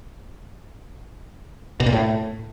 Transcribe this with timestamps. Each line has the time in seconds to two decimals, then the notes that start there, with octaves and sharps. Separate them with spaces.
1.80 B2
1.86 A#2
1.93 A2